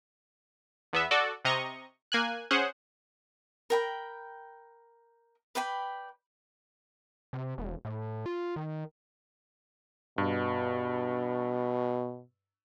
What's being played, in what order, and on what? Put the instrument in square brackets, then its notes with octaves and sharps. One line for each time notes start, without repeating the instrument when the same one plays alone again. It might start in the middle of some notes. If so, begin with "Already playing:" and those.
[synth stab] E2 B3 E5
F#4 A4 D5
C3 D#5 A#5 C#6
A#3 G#5 F#6
C#4 G#4 C5 F#5
[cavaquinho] A#4 G5 B5
B4 D5 G5 B5
[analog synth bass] C3
E1
A2
F4
D#3
[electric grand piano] G2 [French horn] B2